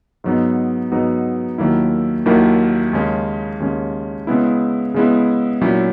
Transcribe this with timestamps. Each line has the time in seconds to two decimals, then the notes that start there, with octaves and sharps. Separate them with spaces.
0.24 G#2 F#3 B3 D#4
0.92 G#2 F#3 B3 D#4
1.58 D#2 D#3 F#3 A#3 E4
2.26 D#2 D#3 F#3 A#3 E4
2.93 D#2 C#3 G#3 C#4
3.60 D#2 C#3 G#3 C#4
4.27 C#3 G#3 B3 E4
4.94 C#3 G#3 B3 E4
5.61 A#2 F#3 C#4 E4